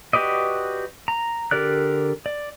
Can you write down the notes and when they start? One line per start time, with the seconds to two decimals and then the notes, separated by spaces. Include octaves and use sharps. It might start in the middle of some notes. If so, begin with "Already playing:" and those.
0.13 F#4 G4 B4 D5 D#5
1.08 A#5
1.51 D3 G4 A#4 D5 F#6
2.26 D5